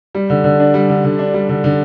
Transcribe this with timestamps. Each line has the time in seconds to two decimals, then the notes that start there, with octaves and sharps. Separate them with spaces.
0.15 G3
0.30 D3
0.44 D3
0.59 D4
0.74 G3
0.89 D3
1.04 D3
1.19 D4
1.34 G3
1.49 D3
1.64 D3